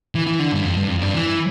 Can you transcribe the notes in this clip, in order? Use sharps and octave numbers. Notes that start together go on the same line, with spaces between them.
E3
E3
D3
G2
F2
G2
F2
G2
E3